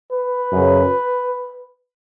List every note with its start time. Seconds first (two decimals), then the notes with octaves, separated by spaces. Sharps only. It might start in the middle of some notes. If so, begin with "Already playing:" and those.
0.13 B4
0.53 F#2 C#3 F#3